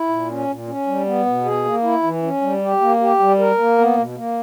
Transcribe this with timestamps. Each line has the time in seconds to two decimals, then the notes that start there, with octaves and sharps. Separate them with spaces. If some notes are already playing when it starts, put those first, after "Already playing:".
Already playing: E4
0.09 A#2
0.28 C#4
0.47 A#2
0.68 C#4
0.87 G3
1.06 B3
1.26 B2
1.45 G#4
1.64 A#3
1.83 E4
2.03 E3
2.23 C#4
2.41 G3
2.62 G4
2.81 A#3
3.01 G4
3.19 G3
3.39 A#4
3.58 A#3
3.78 B3
3.98 B2
4.17 A#3